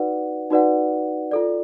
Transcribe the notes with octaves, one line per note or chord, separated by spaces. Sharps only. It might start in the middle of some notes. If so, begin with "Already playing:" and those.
Already playing: D#4 F#4 B4 D5 F#5
D#4 F#4 B4 D5 F#5
F4 A4 D5